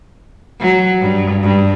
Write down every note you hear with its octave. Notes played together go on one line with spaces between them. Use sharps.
F#3
G2
G2